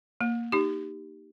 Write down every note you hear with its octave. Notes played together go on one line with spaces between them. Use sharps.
A#3
D#4 G4